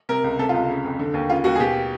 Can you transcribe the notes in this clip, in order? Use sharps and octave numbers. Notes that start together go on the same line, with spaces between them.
C3 A#4
C#2
C3 A4
F4
C#2
C#3
F2
D3
D#2
C#3 F4
D#2 F#4
G#4
B2 G4